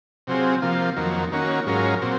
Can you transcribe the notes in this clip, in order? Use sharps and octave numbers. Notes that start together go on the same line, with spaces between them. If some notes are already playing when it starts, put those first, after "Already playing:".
C3 F#3 C4 F4 G#4
C3 F3 A#3 F4
F2 D#3 F#3 A#3
D#3 A#3 C#4 F#4
G#2 F#3 C#4 F4 A#4
A#2 F#3 C4